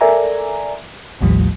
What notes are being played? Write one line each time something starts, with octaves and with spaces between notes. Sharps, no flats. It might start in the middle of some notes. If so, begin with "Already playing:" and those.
A4 A#4 D5 E5 G#5 A#5
A1 D#2 A2 F3 G3